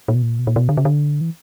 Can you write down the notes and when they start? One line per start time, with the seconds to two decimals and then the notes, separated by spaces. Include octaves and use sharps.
0.08 A#2
0.15 B2
0.22 A#2
0.39 B2
0.47 A#2
0.56 B2
0.69 D3
0.77 C#3
0.85 D3
1.21 E3